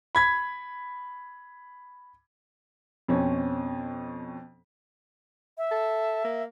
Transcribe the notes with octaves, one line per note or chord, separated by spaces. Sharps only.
B5 G#6 B6
F2 B2 C4 C#4
E5
A4
A#3